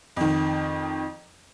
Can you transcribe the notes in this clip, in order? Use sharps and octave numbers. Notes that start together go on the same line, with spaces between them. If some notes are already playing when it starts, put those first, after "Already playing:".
F2 D#3